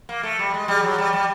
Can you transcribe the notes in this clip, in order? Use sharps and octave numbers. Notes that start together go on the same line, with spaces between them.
A#3
A3
G3
G#3
G3
F#3
G3
G3